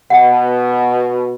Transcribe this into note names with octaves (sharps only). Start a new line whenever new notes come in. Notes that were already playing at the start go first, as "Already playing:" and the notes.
B2 F#5